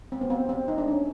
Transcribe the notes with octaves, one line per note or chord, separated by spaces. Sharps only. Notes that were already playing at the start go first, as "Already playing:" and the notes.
C4
B3
C4
C4
D#4
D4
C#4